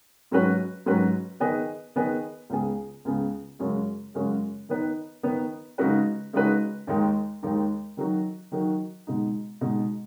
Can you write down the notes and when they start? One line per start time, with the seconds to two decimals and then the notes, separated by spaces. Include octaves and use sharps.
0.31 G#2 F#3 C#4 F#4 B4
0.86 G#2 F#3 C#4 F#4 B4
1.40 D#3 B3 G#4 B4 D#5
1.96 D#3 B3 G#4 B4 D#5
2.50 C#2 C#3 B3 G#4
3.05 C#2 C#3 B3 G#4
3.59 F#2 C#3 G#3 C#4 F#4
4.14 F#2 C#3 G#3 C#4 F#4
4.69 D#3 B3 D#4 B4
5.23 D#3 B3 D#4 B4
5.78 C#3 G#3 D#4 F#4 B4
6.33 C#3 G#3 D#4 F#4 B4
6.87 D#2 D#3 G#3 D#4
7.43 D#2 D#3 G#3 D#4
7.97 D#3 F#3 D#4 F#4
8.52 D#3 F#3 D#4 F#4
9.07 B2 G#3 D#4
9.61 B2 G#3 D#4